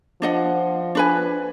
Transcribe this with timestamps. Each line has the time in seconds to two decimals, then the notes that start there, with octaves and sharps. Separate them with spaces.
0.22 F3 D4 D#5 F#5
0.95 D4 B4 G#5